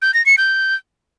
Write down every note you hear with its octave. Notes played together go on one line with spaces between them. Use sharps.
G6
A#6
C#7
G6